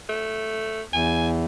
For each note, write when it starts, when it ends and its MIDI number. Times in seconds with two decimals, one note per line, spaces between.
0.09 0.82 57
0.93 1.46 40
0.93 1.28 80